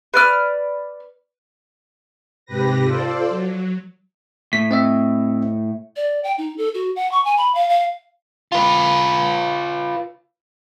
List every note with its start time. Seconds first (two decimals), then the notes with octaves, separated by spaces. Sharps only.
0.14 B4 D5 F6
2.46 G#2 C3 G4 B4 A#6
2.83 F4 A4 C5 D5
3.29 F#3
4.53 A2 B6
4.71 C4 D#5 E5
5.96 D5
6.24 G5
6.38 D#4
6.58 A4
6.74 F#4
6.96 F#5
7.12 C#6
7.25 G#5
7.38 B5
7.55 F5
7.69 F5
8.52 F4 B4